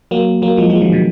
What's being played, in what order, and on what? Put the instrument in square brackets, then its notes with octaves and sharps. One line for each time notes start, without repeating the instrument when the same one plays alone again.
[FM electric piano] F#3 A#3
F#3 A#3
F3 G#3
F3 G#3
D#3 F#3
B2 D#3